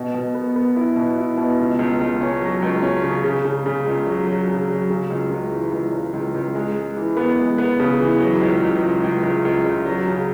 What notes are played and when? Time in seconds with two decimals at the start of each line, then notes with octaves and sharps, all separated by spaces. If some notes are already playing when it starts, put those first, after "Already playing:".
Already playing: B2
0.14 B2
0.34 B3
0.56 B3
0.76 E4
0.96 B2
1.18 E4
1.37 B2
1.59 C#2
1.79 C#2
2.00 C#2
2.21 C#4
2.42 F#3
2.62 C#2
2.82 C#4
3.03 C#3
3.24 C#3
3.45 C#3
3.66 C#3
3.86 C#2
4.06 F#3
4.27 F#3
4.48 C#3
4.69 F#3
4.90 C#3
5.10 C#2
5.30 C#2
5.52 E3
5.72 C#2
5.92 C#3
6.14 C#2
6.35 C#2
6.55 G#3
6.75 G#3
6.97 E3
7.17 B3
7.37 G#3
7.58 B3
7.79 C#3
8.00 E3
8.20 F#3
8.41 C#2
8.62 C#2
8.82 C#2
9.04 C#2
9.23 C#2
9.45 C#2
9.66 C#2
9.86 F#3
10.07 C#3